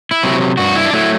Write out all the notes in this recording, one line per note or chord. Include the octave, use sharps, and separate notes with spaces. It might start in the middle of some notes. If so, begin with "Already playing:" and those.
E4
C3 F#3
G2 F#4
E4
D4
F#3 A3 E4